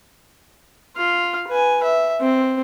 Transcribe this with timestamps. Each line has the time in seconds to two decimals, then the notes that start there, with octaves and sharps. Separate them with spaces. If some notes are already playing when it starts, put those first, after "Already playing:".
0.96 F4 F5
1.48 B4 G#5
1.83 E5
2.21 C4